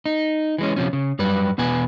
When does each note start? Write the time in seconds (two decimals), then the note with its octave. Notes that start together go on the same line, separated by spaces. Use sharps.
0.06 D#4
0.58 E3 G#3 C#4
0.76 C3 F3 C#4
0.93 C#3
1.19 F#2 G3 B4
1.58 E2 B2 B4 G#5